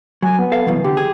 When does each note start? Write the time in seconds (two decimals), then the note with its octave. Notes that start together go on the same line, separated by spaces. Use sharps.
0.22 F#3 G#5
0.39 B3
0.52 A4 F5
0.67 C2 F#2 B2 E3
0.84 D3 G4
0.97 G#4